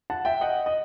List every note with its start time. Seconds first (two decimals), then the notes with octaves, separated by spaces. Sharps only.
0.10 F#5 A5
0.25 E5 G5
0.41 D#5 F#5
0.66 D#5